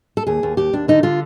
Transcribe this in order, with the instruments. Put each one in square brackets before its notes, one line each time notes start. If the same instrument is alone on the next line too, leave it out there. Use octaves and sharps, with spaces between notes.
[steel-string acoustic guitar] A4
D#2 G#4
D#2
D#2 G4
D#2 D4
D3 D#4
D3 F4